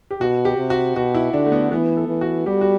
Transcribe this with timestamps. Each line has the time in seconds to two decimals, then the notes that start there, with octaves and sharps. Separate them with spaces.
0.11 G4
0.20 B2 F#4
0.45 G4
0.58 C3
0.70 F#4
0.95 B2 F#4
1.14 E4
1.33 D3 D4
1.46 A3
1.52 B3
1.72 E3 B3
1.97 A4
2.09 E3
2.21 F#4
2.46 G3 G4
2.61 F#4